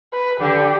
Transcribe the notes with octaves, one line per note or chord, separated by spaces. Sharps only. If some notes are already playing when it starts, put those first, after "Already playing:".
B4
D3 G4